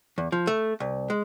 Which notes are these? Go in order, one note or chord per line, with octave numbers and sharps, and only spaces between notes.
E2
F3
A3
C2
G#3